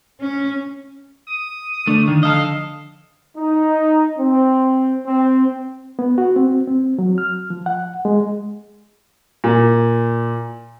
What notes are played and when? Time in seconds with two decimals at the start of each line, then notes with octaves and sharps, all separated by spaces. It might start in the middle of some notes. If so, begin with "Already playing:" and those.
0.21 C#4
1.27 D#6
1.87 D3 A3 D4
2.08 D#3 F3
2.23 A4 D#5 F5
3.37 D#4
4.18 C4
5.06 C4
5.99 B3
6.18 F#4
6.36 C4
6.67 C4
6.99 F#3
7.18 F6
7.50 F3
7.66 F#5
8.05 G#3
9.44 A#2